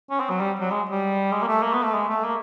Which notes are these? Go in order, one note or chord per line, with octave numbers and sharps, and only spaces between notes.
C#4
C4
F#3
G3
F#3
G#3
G3
G#3
A#3
A3
A#3
B3
A3
G#3
A3
A#3